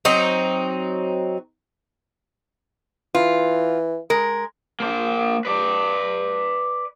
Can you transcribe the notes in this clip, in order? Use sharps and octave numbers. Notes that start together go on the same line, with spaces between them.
F#3 C4 D#4
E3 F4
G#3 A#4
A#3 C5
B4 D5